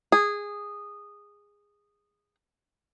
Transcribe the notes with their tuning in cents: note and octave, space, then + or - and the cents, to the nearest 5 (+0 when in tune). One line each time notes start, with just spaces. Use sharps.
G#4 -15